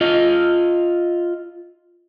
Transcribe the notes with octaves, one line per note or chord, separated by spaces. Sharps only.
F4 D#5